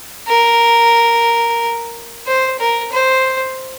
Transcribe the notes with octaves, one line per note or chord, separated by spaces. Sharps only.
A#4
C5
A#4
C5